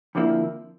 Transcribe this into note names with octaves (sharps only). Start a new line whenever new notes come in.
F2 D3 F3 A#3 E4